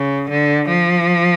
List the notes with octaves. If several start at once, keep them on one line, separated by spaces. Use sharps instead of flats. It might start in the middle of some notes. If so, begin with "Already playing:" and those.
Already playing: C#3
D3
F3